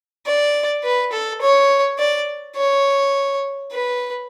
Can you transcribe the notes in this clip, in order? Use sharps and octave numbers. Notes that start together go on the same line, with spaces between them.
D5
B4
A4
C#5
D5
C#5
B4